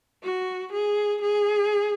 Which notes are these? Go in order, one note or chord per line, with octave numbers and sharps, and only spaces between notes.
F#4
G#4
G#4